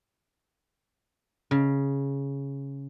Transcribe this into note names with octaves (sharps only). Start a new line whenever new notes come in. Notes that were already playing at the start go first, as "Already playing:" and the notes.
C#3